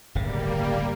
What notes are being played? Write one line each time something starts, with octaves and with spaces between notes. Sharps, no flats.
D1 G1 C#3 G3 A#3